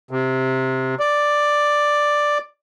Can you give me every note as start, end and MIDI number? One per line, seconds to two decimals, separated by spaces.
0.11 0.95 48
1.00 2.38 74